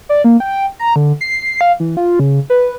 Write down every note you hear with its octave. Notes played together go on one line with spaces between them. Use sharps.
D5
A#3
G5
A#5
D3
C7
F5
E3
F4
C#3
B4